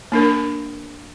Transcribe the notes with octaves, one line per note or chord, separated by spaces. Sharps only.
A#3 D4 A#4